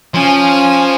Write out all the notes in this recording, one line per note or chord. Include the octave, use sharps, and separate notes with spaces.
F3 C#4 G#5